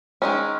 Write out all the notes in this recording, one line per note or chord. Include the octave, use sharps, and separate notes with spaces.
D#3 G#3 C#4